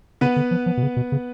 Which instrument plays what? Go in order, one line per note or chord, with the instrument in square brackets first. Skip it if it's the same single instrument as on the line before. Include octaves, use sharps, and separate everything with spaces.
[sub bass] C#3 [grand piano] B3 B4
[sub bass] D3
F3
F3
B2
C#3
B2
C#3